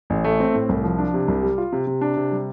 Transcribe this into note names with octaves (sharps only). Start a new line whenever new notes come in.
A1
A3
C4
A2
C2
F3
D4
C3
C2
G3
F4
C3
C3
D4
C3
G3